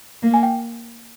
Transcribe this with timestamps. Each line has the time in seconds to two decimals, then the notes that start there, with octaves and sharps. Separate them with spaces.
0.23 A#3
0.34 G#5
0.43 G5